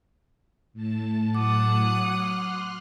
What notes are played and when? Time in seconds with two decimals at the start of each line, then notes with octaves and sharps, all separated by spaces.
0.73 A2 A5
1.35 F#3 F#5 D6 D#6
2.10 C6 F6 F#6